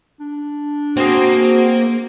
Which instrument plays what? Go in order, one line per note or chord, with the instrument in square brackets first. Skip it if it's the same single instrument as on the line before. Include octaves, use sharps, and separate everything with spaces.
[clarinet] D4
[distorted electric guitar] A#3 [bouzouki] C4 G#4 [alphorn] F#4